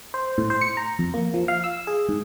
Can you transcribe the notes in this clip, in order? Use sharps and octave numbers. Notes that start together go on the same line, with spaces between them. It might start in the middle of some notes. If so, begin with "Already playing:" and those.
C5
A2
C5
C#7
A#5
F2
A#3
F3
F5
E6
G#4
G#2